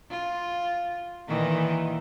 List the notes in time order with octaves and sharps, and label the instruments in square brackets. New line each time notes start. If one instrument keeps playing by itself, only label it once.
[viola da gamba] F4
A#2 D#3 E3